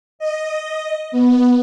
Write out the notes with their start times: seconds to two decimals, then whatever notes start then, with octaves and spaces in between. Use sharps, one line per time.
0.19 D#5
1.12 B3